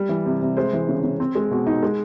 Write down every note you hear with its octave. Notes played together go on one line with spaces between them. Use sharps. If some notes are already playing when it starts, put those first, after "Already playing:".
Already playing: G3
E3
C3
C3
G#3 C5
E3
C#3
C#3
C4
G#3
B2
D#4
G#3